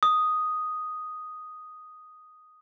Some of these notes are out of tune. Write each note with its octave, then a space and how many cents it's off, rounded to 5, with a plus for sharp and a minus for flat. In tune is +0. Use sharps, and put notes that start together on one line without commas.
D#6 +0